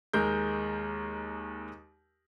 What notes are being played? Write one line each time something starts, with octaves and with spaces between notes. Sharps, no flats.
D#2 G#3 A#4 G6